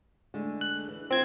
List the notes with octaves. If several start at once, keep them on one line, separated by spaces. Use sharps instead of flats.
D3 G#3 A3
F#6
E3
C4 F4 G#6